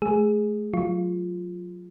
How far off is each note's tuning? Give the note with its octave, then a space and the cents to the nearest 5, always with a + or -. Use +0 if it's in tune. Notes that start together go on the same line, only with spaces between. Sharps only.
A3 -40 G#4 +0
F#3 -30 F4 +0